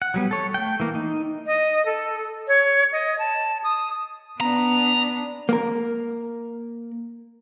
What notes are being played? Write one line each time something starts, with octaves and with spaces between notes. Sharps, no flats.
F#5
F#3 G3 B3
A4 C#5
A3 G5
E3 A#3
D#4
D#5
A4
C#5
D#5
A5
D#6
B3 D4 A#5
A#3 A#4